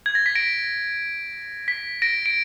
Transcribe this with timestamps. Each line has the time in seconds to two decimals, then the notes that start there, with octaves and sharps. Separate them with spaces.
0.06 G#6
0.15 A#6
0.26 B6
0.35 A#6 D7
1.68 B6
2.02 A#6 D7
2.26 D7